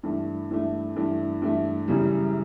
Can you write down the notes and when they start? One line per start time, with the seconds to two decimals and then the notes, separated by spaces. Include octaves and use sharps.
0.03 G2 E3 A3
0.50 G2 E3 A3
0.96 G2 E3 A3
1.42 G2 E3 A3
1.88 F#2 C#3 E3 G3